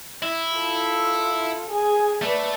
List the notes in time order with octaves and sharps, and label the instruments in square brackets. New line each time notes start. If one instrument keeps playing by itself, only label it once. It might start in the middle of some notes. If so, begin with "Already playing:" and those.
[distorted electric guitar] E4
[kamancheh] F4 A4
G#4 G#5
[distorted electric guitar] A3 [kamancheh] B4 D5